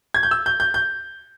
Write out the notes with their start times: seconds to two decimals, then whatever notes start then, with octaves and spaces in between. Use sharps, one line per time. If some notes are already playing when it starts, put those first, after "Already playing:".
0.14 G#6
0.23 G6
0.31 E6
0.46 G6
0.60 G6
0.74 G6